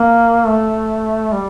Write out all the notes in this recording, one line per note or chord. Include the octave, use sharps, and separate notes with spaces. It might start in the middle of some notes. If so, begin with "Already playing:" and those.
Already playing: A#3
A3
G3